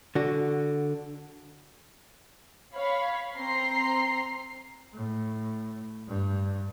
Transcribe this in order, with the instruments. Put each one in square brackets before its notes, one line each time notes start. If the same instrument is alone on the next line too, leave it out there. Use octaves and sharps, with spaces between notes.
[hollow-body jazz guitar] D3 F#4
[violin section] C#5 F5 B5
C4 A#5 C6 C7
[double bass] A2
G2